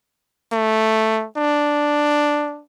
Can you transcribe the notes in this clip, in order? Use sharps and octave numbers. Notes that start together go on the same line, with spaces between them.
A3
D4